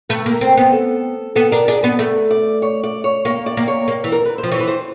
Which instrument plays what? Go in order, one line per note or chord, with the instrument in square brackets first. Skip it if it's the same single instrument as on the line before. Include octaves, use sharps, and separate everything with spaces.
[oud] A3 [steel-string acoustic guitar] B4
[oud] A#3
[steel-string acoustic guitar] A#4
[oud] C4
B3
[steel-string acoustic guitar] A4
[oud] B3 [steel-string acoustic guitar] A4
[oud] D4 [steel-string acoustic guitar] A#4
[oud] D4 [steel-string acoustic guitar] G#4
[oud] B3 [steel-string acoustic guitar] B4
[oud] A3
[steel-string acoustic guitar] D5
C#5
D5
C#5
[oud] A#3 [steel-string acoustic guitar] C#5
[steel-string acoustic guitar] D5
[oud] A#3
[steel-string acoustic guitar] C#5
[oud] A#3
E3
[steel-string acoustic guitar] A#4
B4
C5
[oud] F3
[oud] E3 [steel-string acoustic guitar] C#5
[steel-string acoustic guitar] B4
C5